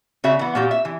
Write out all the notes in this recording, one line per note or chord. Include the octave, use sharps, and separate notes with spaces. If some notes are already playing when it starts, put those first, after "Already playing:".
C#3 F#4 E5
E3 B3
A#2 F#4 G4
E5
E3